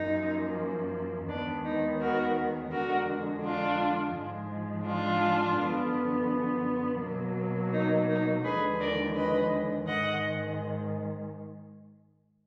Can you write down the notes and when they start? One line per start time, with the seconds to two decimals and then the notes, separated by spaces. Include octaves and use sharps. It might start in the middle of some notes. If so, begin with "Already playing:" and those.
Already playing: F#2 F3 A#3 D#4
1.29 D#2 D#3 G#3 B3 D4
1.65 D#4
2.00 F#4 A#4
2.71 F2 D3 G#3 F#4 A#4
3.43 D4 F4
4.14 G#2 F3 G#3
4.86 D4 F4
5.58 F#2 D3 F3 B3
7.01 B2 F#3 A#3
7.73 D#4
8.08 D#4
8.43 D#2 D3 F3 G#3 G#4 B4
8.80 A#4 D5
9.15 B4 D#5
9.86 G#2 D#3 G#3 D#5 F#5